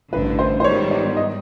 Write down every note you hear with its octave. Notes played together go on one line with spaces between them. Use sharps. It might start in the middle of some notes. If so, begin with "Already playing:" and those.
A1 G2 D3 B4
C5
C5
G#2 D#3 G3 B3 C#5
D5
D#5